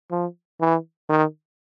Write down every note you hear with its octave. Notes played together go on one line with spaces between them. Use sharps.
F3
E3
D#3